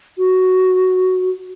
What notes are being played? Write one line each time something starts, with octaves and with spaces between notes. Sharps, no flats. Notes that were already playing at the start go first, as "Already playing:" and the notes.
F#4